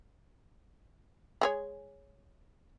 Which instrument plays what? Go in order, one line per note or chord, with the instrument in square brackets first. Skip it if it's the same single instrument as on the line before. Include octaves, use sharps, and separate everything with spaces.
[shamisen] G#3 G#4 C#5